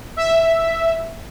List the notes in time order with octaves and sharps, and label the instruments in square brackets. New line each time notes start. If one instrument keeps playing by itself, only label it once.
[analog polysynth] E5